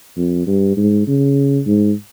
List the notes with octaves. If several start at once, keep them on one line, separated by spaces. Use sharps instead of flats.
F2
G2
G#2
C#3
G#2